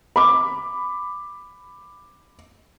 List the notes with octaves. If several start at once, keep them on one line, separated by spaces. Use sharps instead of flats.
B5 D6